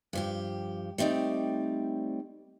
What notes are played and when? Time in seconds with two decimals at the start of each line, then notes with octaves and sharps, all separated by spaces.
0.13 G2 F3 G4
0.98 G3 A3 C4 D#4 D5